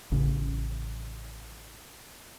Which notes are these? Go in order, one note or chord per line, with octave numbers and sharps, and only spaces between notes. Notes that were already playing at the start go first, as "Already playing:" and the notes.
A1 C#3